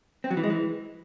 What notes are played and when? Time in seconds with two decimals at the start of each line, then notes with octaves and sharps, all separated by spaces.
0.24 C4
0.31 F#3
0.37 E3
0.43 G#3
0.50 E3